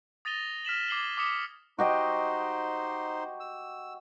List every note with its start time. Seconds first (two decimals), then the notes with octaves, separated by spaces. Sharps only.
0.25 D#6 A6 A#6 D#7 F7 G7
0.65 F6 B6 E7 F#7
0.88 D6 G#6 C7 E7 F#7 G7
1.17 D6 D#6 B6 C#7
1.79 D#4 F#4 G4 C5 D#5
3.40 E6